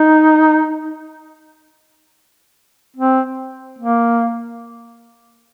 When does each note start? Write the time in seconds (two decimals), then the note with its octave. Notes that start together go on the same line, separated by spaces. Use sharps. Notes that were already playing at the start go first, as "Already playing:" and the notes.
Already playing: D#4
2.97 C4
3.79 A#3